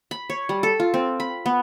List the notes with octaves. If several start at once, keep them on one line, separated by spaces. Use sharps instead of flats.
B5
C#5
G3
A4
F4
C4
B5
B3